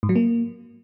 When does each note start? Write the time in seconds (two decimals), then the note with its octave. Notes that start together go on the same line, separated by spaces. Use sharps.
0.03 G#2
0.09 F#3
0.16 A#3